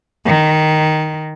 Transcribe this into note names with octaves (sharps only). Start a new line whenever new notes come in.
D#3